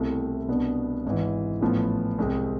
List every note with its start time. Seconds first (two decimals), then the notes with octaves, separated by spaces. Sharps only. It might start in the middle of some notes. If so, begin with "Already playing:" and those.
Already playing: C2 B2 A3 C4 E4
0.48 C2 B2 B3 D4
1.05 G#1 G#2 E3
1.61 A1 A2 F3 B3
2.18 C2 C3 G#3 C4